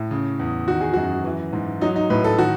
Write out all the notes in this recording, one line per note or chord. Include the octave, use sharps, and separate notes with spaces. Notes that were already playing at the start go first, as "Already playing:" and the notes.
Already playing: A2
C#3
E2
D#3 F#4
G#4
F#2 F#4
E3
G#2
F#3 D#4
D#4
A2 B4
A4
D#3 F#4